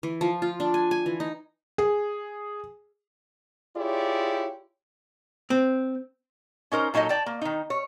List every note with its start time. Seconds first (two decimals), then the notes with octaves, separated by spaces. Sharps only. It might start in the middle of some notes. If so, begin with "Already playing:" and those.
0.03 E3
0.21 F3
0.42 F4
0.60 D4
0.74 G#5
0.91 G#5
1.06 E3
1.20 D#4
1.78 G#4
3.76 E4 F4 G4 G#4 C#5 D5
5.50 C4
6.72 C#4 D#4 A#4 C5
6.94 A#2 F#3 D#4 A4 D#5
7.09 D5 G5 A5
7.26 A#3
7.41 D#3 D#4
7.70 C#5